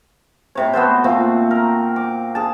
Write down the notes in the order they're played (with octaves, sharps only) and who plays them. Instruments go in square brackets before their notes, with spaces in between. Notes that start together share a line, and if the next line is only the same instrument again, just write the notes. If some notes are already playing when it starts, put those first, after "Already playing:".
[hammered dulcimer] A2 C3 C#5
B3 F#4 A4 C5
A#2 A3 C4
A#4
D6
G#4 A5